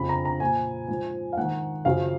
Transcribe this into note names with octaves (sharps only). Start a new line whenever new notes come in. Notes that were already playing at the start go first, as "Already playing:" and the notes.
Already playing: F2 C#3 F3 B5
A#5
A#5
A#2 F3 G#5
G#2 F3
F5
G#2 D#3 F#5
F#2 C#3 F3 F5